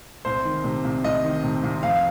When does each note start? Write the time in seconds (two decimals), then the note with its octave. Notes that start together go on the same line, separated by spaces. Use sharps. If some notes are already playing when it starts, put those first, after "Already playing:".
0.25 C2 C5
0.45 D#3
0.64 C3
0.85 C2
1.04 C2 D#5
1.24 D#3
1.44 C3
1.63 C2
1.83 F2 F5